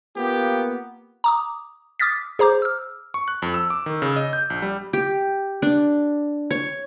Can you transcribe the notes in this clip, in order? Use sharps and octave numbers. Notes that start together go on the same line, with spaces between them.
A#3 B3 F4 G4
A#5 D6 D#6
D6 D#6 F6 A6 B6
G#4 C5 A#5 D6 G6
E6 F6
C#6
F#6
F2
E6
D6
D#3
C#3
D#5
G6
A#1
G3
G4
D4
C#5